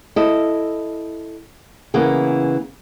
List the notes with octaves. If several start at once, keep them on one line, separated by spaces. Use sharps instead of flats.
E4 A4 D#5
C#3 E3 A#3 B3